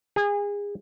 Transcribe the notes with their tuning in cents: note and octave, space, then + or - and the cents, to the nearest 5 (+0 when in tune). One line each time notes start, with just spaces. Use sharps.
G#4 -30